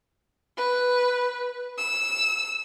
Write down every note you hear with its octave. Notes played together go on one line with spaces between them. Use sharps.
B4
E6